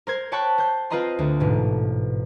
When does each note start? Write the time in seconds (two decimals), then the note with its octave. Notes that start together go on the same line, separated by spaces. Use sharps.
0.07 A#4 C5 G#6
0.32 C#5 G5 A5 B5 C#6 F#6
0.58 C5 G6
0.90 C4 F4 B4 D#5 A#5 C6
1.19 D2
1.40 A1 G#2 B2